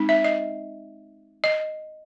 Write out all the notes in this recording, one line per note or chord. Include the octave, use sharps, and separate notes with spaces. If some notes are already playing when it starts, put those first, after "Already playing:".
Already playing: G#3 C4 D#4
E5
D#5
D#5